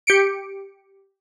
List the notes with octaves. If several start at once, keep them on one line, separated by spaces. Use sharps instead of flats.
G4 C#7 D7